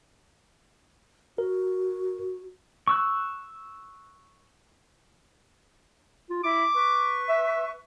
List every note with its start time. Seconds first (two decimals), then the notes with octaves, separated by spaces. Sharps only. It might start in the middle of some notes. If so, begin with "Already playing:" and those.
1.38 F#4 A#4
2.88 C#6 E6 F#6
6.30 F4
6.44 E4 D6
6.75 B4 C#6
7.29 E5